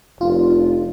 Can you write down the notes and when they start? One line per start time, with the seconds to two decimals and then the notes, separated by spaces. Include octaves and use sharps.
0.21 F1 D4 F4